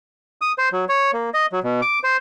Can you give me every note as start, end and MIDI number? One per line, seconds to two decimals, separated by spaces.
0.41 0.52 87
0.58 0.69 72
0.72 0.85 54
0.89 1.11 73
1.13 1.30 58
1.34 1.46 75
1.52 1.60 54
1.64 1.81 47
1.82 1.99 86
2.04 2.17 72